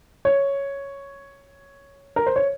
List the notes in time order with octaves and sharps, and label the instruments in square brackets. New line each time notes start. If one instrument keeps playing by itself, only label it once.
[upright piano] C#5
A#4
C5
C#5